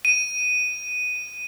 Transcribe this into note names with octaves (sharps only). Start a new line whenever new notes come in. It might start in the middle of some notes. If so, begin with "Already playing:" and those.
D#7